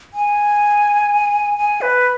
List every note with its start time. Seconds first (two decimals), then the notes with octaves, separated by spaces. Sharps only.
0.14 G#5
1.58 G#5
1.82 B4